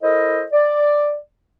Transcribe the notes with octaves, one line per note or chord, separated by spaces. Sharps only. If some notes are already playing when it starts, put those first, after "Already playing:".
E4 A4 A#4 C5 D#5
D5